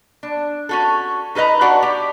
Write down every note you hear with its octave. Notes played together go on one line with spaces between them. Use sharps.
D4
C#4 F#4 A4
D#4 A4 B4 D#5 A#5
D4 F#4 D5 F#5
G4